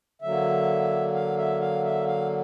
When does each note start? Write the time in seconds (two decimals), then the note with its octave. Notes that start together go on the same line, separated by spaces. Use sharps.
0.22 D3 F#3 A#3 E5
1.14 F5
1.38 E5
1.61 F5
1.84 E5
2.07 F5